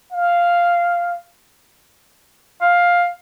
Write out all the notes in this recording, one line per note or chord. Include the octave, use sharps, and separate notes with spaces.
F5
F5